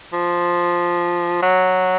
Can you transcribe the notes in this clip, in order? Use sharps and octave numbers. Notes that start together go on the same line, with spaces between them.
F3
F#3